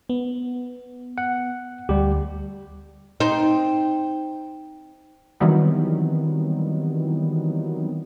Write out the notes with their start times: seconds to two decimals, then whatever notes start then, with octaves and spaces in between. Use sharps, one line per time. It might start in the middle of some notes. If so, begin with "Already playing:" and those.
0.09 B3
1.18 F#5
1.89 D2 G3 G4
3.20 C4 D#4
5.40 D#3 E3 F#3 G3 B3 C4